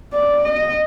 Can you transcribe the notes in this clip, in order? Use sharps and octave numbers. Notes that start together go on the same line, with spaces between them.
D5
D#5